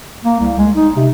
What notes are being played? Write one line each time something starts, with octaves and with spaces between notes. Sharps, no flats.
A#3
C2
G#3
D#4
C3